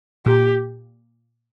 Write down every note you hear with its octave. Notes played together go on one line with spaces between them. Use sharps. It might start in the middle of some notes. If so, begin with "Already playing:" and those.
A#2 G4